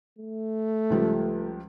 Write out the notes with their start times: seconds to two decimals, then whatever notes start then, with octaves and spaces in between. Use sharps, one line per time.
0.18 A3
0.90 C#2 F3 G3